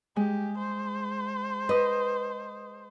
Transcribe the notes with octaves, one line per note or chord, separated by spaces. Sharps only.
G#3 G4
C5
B4 D#5 D#6